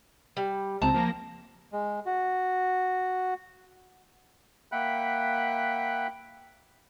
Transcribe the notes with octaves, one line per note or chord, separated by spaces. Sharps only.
G3
C#2 C4 A5 A#5
F3 A#3 A#6
G#3
F#4
A#3 E5 F#5 G5 B5 F#6